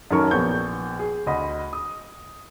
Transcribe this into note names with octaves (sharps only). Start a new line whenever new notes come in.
F#2 D#3 C#4 A4 A#4 C#6
A#1 B3 C#6 G6
G#4
D2 D#5 B5
D#6